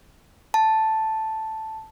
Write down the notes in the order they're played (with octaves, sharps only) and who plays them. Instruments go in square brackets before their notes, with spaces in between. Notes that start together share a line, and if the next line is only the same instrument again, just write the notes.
[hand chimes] A5